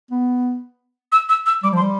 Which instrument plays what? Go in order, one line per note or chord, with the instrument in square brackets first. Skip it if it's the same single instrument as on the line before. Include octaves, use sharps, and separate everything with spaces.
[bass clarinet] B3
[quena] E6
E6
E6
[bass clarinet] G3 [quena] D6
[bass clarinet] F3 [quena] C6
[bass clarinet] G3